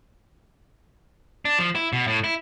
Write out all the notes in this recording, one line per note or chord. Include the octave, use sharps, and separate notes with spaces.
D4
F3
E4
B2
A2
E4